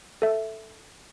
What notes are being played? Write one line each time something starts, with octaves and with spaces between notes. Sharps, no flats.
A4 E5